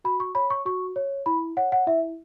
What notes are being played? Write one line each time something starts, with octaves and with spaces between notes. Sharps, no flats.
F#4 B5
C#6
C#5 B5
C#6
F#4 C#6
C#5
E4 B5
C#5 F#5
F#5
E4 E5